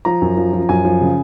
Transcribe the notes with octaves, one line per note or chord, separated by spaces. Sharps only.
F3 A#5
F#2
F3
F3
F#2 G#5
F3
C#3